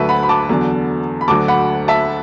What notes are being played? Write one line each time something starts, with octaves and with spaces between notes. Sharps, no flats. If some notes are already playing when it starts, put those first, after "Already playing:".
Already playing: D2 D3 F#3 B4 E5 A5
F#5 B5
B5
A5 D6
E2 D3 F#3
B5
D2 D3 F#3 A5 D6
F#5 B5
E5 A5